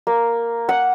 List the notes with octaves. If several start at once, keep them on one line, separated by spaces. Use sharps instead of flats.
A#3
F#5